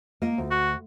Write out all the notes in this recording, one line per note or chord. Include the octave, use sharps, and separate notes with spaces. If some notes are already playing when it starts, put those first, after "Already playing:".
A#3 F4 D#5
D2
F#4